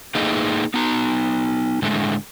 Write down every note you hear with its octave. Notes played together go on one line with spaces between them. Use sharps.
A3 A#3 D#4 G#4 D#5 F5
B3 D#4 A#5
A2 D3 G#3 A3